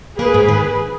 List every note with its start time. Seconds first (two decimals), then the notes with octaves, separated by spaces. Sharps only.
0.19 A#3 G#4 B4
0.34 G#2
0.48 D#3